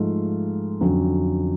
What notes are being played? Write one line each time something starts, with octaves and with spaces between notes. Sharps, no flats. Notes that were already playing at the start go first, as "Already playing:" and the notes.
Already playing: G#2 F3 A3 F4
F2 D3 F#3 C#4